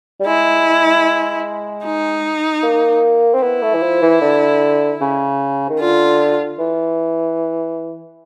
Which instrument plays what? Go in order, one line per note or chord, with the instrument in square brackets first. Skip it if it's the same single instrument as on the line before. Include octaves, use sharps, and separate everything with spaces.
[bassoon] G3
[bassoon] G#3 [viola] E4
[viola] D#4
[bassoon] A#3
C4
[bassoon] B3 [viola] E4
[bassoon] A3
E3
F3
E3
D3
C#3
D#3
[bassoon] D3 [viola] F4
[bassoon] E3